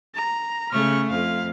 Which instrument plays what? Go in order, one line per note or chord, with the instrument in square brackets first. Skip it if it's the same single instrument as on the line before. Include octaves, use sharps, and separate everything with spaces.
[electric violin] A#5
[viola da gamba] C#3 A3 [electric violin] C#6 F6
[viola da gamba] F2 [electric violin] F5